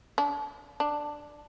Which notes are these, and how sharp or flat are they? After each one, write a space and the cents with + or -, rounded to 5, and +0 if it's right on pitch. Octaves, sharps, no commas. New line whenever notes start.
D4 -35
D4 +5